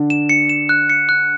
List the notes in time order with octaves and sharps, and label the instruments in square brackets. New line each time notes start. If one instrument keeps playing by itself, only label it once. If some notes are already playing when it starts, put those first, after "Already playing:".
Already playing: [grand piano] D3 D4
[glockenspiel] E7
C#7
E7
F#6
C#7
F#6